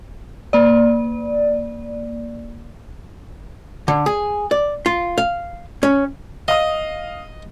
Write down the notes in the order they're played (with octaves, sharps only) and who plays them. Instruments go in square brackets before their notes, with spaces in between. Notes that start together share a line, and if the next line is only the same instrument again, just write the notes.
[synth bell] A#3 D5
[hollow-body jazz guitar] D3
G#4
D5
F4
F5
C#4
[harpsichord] D#5 [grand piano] F5 D#6